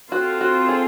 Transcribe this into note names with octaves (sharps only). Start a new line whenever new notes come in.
C4 F4 F#4 A4 C5
F#4
G#4